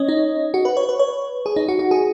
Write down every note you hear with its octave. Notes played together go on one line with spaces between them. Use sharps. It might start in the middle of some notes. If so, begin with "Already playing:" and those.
Already playing: C#4 C#5 D#5
D#4
F#4
B4
C#5
B4
C#5
G#4
D#4
F#4
F#4
G#4